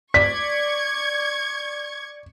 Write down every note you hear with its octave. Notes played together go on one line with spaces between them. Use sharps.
D5 C#6 G#6 B6